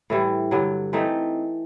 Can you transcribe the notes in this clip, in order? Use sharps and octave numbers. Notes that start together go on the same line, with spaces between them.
A2 E3 G3
G2 D3 F#3
E3 A3 C4 D#4